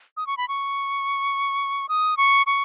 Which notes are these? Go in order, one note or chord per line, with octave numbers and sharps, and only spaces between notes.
D#6
C#6
B5
C#6
D#6
C#6
C#6